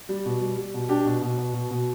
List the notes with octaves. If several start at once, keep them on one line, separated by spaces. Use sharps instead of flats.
G3
B2
G3
G3
B2
D4 G4
B2
B2
B2
B2
B2